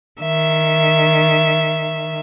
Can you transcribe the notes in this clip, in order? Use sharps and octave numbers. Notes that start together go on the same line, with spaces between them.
D#3 E5